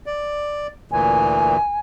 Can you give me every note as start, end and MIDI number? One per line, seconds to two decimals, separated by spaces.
0.06 0.67 74
0.92 1.57 38
0.92 1.57 46
0.92 1.57 52
0.92 1.80 80